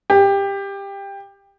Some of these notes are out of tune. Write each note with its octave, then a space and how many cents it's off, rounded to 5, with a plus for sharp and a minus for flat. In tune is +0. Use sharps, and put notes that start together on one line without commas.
G4 +15